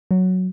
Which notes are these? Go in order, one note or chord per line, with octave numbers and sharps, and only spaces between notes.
F#3